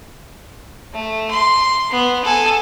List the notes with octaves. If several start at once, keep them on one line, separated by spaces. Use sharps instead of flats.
A3
C6
B3
A4 G#5